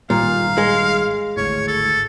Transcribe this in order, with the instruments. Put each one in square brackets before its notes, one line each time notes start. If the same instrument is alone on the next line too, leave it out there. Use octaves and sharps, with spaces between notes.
[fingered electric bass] G#1 D#3 G3 [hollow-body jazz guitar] A#2 [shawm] F5
[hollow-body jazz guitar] G#3
[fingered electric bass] G#1 D2 A2 [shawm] C#5
[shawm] A4